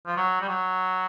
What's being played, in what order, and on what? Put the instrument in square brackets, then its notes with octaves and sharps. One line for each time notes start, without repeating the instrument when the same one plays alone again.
[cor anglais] F3
F#3
G3
F#3